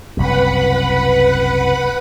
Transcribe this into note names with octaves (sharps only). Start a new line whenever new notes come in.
F#1 C2 F#2 B4 F#5 B5